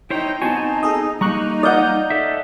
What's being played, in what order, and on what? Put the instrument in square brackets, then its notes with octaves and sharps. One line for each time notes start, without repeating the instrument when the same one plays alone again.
[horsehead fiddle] D#4 G5 [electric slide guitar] E4 C5 C#5
[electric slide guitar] B3 C4 F#4 [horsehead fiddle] D#4 [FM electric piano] G#5 A5
[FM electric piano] G#4 A4 D#5
[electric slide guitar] G3 A#3 [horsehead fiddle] D#4 [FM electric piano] A#5 C#6 F#6
[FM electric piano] D5 F5 G6 [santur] D#5 F#5
[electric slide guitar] A4 E5